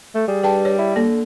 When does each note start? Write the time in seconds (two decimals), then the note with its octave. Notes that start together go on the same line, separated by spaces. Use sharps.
0.15 A3
0.27 G3 G#4
0.43 G2 G#4 G5 A5
0.65 C#5
0.78 E4
0.96 D3 A#3